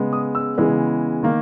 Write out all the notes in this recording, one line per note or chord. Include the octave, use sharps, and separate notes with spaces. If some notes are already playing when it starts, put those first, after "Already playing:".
Already playing: C#3 G#3 B3
D#6
E6
C#3 E3 G#3 B3
D#3 A#3